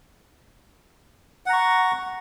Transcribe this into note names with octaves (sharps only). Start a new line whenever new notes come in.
F#5 A#5 C#6